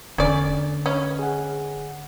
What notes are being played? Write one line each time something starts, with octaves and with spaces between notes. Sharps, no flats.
E1 D3 C#4 D5
C#4 B4 C#5 D#5
G#4 F#5